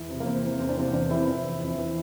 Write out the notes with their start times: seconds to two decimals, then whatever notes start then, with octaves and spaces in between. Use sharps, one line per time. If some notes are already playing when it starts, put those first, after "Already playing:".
Already playing: E2 E4
0.09 C3 E3
0.20 A#3
0.25 E2 C4
0.43 C3 E3
0.60 E2 C4
0.69 D4
0.77 C3 E3 C4
0.93 E2 D4
1.11 C3 E3 E4
1.28 F2
1.45 E3
1.61 F2
1.78 E3